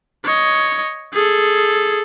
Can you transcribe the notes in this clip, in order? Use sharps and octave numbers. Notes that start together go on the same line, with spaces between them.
C#5 D#5
G#4 A4